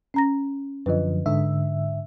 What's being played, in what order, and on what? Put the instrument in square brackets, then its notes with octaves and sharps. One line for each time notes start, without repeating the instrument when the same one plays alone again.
[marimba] C#4 A#5 A#6
[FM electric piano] F#2 D3 F3 [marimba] B4 D#5
[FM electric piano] G#2 D3 E5